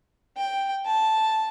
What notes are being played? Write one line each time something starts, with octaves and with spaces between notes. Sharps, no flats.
G5
A5